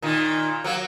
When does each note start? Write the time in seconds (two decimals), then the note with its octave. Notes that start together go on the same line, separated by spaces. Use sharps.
0.02 A#2 D#3
0.64 F#3 A#3